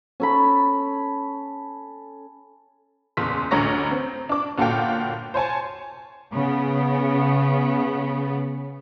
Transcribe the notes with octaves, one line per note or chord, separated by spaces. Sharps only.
C#4 A4 B5
F#1 E2 C6 B6
A1 D2 C#5 A#5 C#6 A#6
C4
D4 D6
G1 A#2 F#4 A4 F5 G5
C5 C#5 G#5 A5
C#3 B3